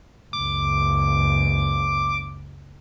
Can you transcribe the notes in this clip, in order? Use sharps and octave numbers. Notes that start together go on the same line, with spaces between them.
F#1 C#2 D6